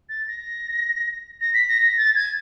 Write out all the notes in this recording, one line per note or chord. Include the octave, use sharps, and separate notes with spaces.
A6
A#6
A#6
B6
A#6
A#6
A6
G#6